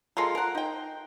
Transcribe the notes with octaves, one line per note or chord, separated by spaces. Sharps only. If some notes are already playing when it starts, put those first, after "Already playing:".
G#3 F4 A4 A#4
A#4 F#5
D#4 G5